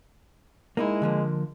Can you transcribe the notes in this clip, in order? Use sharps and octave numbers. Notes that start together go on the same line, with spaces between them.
G#3 A#3 D#4 E4
D3 F3 A#3